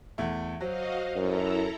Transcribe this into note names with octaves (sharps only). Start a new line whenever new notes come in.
E2 A3
F#3 F#4 C5 D#5 F5
F#2 E4 A4 A#5